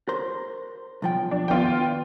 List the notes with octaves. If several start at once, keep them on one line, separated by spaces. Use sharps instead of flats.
A#4 C5
B1 F3 G5
D4
D#2 B3 F4 G5